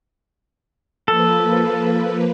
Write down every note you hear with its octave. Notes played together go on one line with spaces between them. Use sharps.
F3 A#3 A4 B4